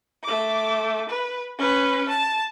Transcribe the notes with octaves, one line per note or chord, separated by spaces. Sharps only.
A3 D6
B4
C#4 B4
A5